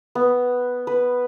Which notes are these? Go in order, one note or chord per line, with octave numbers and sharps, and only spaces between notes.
B3
B4